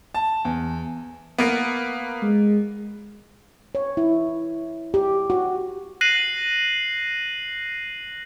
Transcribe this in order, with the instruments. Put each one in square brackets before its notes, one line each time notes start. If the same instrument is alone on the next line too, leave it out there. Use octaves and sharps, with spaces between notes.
[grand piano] A5
E2
[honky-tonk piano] A#3 B3
[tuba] G#3
[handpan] C#5
E4
G4
F#4
[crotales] F#6 A#6 C7 D#7 F#7